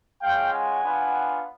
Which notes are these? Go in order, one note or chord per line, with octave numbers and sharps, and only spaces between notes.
G#3 C#4 F4 F5 G5
F#5 G#5
B3 D4 F4